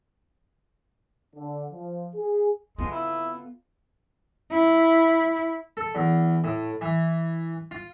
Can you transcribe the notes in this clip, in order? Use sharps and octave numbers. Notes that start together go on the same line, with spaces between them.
D3
F3
G#4
G#3 B3 C4 F4 A4
E4
E4
A4
E2
A2
E3
F4